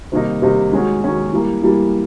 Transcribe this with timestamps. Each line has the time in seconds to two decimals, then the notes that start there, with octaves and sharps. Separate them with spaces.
0.12 C3 D#3 G3 A#3 D#4
0.42 C3 D#3 G3 A#3 D#4
0.72 D#3 G#3 C#4 F#4
1.02 D#3 G#3 C#4 F#4
1.32 E3 G3 A#3
1.62 E3 G3 A#3